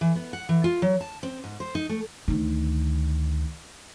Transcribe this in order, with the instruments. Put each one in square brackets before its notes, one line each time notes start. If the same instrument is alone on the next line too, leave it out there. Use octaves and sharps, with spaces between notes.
[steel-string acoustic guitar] E3
B3
F#5
E3
F4
F#3
A5
C4
G#2
C5
D#4
A3
[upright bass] D2 D#3